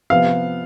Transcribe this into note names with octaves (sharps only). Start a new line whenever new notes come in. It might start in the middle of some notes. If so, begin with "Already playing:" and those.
C3 F3 B3 F5